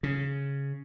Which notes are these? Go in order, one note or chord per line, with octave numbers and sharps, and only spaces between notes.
C#3